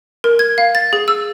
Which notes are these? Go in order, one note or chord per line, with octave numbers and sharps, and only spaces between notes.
A#4
G#6
F5
A6
G#4
E6